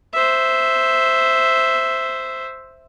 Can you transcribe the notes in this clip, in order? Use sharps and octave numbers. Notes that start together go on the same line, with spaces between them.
C5 E5